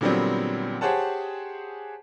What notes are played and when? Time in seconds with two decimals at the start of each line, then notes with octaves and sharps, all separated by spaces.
0.01 A#2 D3 F#3 G3 B3 C4
0.81 G4 G#4 C5 C#5 F#5 A5